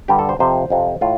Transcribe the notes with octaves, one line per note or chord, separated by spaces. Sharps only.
G2 D3 G3 G4
A4
C5
F2 C3 F3 C5
F2 C3 F3
A2 F4